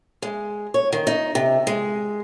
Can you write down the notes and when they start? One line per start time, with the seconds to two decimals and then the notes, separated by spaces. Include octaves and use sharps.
0.22 G#3
0.74 C#5
0.93 D#3
1.07 D#4
1.35 C3
1.67 G#3